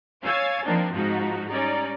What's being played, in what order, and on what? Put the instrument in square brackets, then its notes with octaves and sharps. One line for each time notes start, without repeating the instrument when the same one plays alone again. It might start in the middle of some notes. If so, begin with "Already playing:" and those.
[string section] C#5 F5 G#5 E6 G#6 A6
F3 A#3 C4 D4 D#4
G#2 F3 D#4 F#4
G3 C#4 D#4 D5